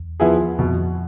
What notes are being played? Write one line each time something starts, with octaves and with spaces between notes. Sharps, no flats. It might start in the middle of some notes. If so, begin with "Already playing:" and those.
Already playing: E2
F3 B3 E4 G#4
F2 B2